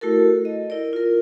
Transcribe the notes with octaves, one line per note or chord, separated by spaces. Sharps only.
A3 E4 F#4 A4 A#4
D#5
E4 A#4 D5
F4 A#4